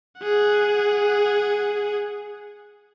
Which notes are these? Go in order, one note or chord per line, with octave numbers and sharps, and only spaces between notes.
G#4 F#5